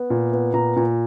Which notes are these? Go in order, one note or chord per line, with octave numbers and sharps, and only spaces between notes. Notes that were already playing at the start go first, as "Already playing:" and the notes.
Already playing: B3
A#2
B3
A#2 A#5
A#2